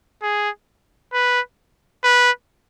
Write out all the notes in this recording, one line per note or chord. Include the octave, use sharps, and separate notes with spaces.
G#4
B4
B4